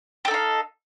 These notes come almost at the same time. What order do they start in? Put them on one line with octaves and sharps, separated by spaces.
G4 A4 D#4 F5